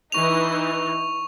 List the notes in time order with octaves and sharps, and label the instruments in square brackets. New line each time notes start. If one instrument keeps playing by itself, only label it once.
[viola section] E3 D#4 [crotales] C#6 F7